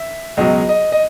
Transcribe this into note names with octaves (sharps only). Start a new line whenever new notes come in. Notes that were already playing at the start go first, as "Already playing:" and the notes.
Already playing: E5
C#2 B2 F#3 D#5
D#5
D#5